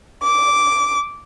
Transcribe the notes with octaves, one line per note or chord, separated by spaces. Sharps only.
D6